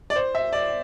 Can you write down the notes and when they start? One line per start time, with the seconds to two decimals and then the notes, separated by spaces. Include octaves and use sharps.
0.10 D5
0.16 C5
0.35 E5
0.53 D5